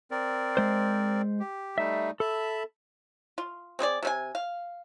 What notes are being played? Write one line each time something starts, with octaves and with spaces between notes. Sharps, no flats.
C4 A#4 D5
G#3 C5
G4
G3 A3 D#4 E5
A4 E5 A5 B5
F4
C4 G#4 C5 D5
C3 C#4 G#5
F5